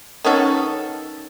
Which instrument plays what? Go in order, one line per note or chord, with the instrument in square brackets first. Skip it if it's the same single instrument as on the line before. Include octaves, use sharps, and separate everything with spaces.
[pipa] D#3 B3 C#4 A4